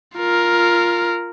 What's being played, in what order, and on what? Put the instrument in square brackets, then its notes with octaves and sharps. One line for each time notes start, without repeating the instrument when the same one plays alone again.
[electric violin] F4 A#4